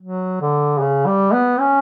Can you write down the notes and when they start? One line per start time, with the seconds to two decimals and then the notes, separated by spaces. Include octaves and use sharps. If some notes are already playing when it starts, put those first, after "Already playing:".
0.02 F#3
0.41 D3
0.80 C#3
1.07 G3
1.33 B3
1.59 C#4